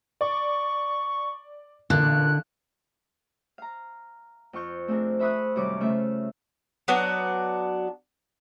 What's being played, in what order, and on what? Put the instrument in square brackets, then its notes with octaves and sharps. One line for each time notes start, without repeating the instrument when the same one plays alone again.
[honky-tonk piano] D5 [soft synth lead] C#6
[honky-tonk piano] A1 A#2 [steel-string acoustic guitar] D3 [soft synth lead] F#6
[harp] F5 A#5
F2 F4 C#6 G6
A3 C4 D4 G#4 A#4
C5 E5 B5 C#6 D#6 F#6
F#2 C3 D#3 G3 C#5 D6
C#3 A3 F4 E5
[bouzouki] F#3 B3 D4 F#4